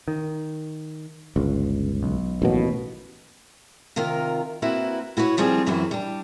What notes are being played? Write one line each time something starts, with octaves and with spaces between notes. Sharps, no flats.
D#3
G1 C#2
B1
A1 D#2 B2
C3 D#3 F4 A#4
A#3 C4 E4 F#4 B4
E4 F#4 B4 C#5
D#3 F3 G3 C4 F4 G#4
F#2 E3 F#3 C4 F#4
G3 D4